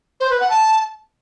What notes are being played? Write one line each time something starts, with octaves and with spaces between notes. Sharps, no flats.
C5
B4
F#5
A5